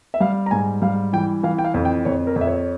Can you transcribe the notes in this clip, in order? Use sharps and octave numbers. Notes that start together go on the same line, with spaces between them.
E5
G3 F5
A#5
G#2 G#5
G3 F5
E3 G5
E3 F5
G5
F5
F2
G5
F2 C#5
A#4
F2
E5
C#5